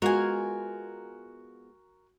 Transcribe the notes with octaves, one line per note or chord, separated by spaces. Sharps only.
G#3 B3 F4 F#4 A#4 G#5